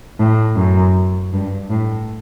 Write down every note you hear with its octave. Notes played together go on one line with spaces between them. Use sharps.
A2
F#2
G2
A2